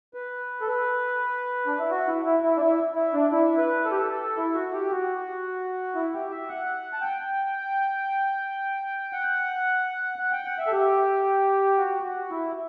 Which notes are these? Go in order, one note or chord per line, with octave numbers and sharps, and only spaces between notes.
B4
A4
B4
D4
E4
F#4
E4
E4
E4
D4
E4
E4
D4
E4
B4
A4
G4
A4
A4
E4
F#4
G4
F#4
E4
G4
E5
F#5
A5
G5
F#5
F#5
G5
F#5
E5
A4
G4
F#4
F#4
E4